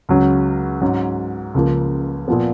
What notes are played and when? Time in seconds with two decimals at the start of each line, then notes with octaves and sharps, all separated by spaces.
0.09 C#2 C#3 F#3 C#4
0.81 G#2 F#3 C#4
1.54 C#2 C#3 F3 A#3
2.28 A#2 F3 B3